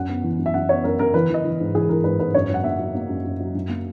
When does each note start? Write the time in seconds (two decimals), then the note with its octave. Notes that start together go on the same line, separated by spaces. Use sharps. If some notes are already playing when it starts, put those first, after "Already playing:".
Already playing: F#2 F#5
0.09 B3
0.24 E3
0.39 F#2
0.46 E5
0.54 F#2 F#5
0.69 B3 C#5
0.84 F#2 A#4
0.99 F#2 A#4
1.14 E3 B4
1.30 E3 D#5
1.45 E3
1.60 G#2
1.75 E3 G#4
1.89 E3 A#4
2.04 G#2 B4
2.20 G#2 B4
2.34 F#2 C#5
2.50 F#3 F#5
2.64 A#3 E5
2.79 F#3
2.95 A#3
3.10 F#2
3.25 F#2
3.40 F#3
3.55 F#2
3.69 A#3